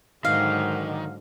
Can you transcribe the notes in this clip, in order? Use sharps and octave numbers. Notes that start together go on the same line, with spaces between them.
G#2 D3 D#3 F#3 F5